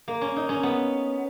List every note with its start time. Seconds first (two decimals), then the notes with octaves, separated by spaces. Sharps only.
0.08 A#3
0.21 C#4
0.36 D#4
0.49 C#4
0.63 B3